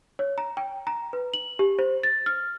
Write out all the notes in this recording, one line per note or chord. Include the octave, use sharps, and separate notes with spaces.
C#5
A#5
G5
A#5
B4
F#7
G4
C5
A6
F6